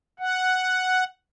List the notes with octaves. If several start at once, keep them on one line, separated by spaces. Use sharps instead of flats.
F#5